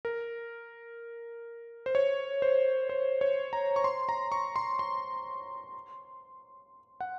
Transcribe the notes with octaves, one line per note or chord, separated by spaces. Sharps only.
A#4
C5
C#5
C5
C5
C#5
A#5
C#6
C6
A#5
C#6
C6
C6
F#5